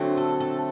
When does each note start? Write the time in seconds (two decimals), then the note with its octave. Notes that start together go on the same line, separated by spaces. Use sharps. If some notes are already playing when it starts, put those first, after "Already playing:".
Already playing: D3 F#3 A3 C4
0.17 A4
0.40 A4